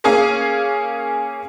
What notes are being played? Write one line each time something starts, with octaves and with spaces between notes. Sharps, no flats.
A#3 C#4 G#4 F5 G#5